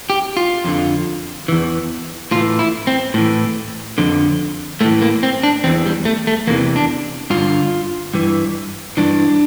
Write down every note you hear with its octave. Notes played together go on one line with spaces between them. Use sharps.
G4
F4
F2 D3
E2 E3
A2 E3 F4
E4
C4
A2 E3
F2 D3
A2 E3 A3
A#3
C4
D4
E2 E3 C4
G3
A3
A3
E2 C3 E3 A#3
D4
G2 D3 F4
G2 E3
G2 E3 D4